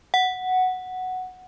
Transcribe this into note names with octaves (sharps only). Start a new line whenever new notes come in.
F#5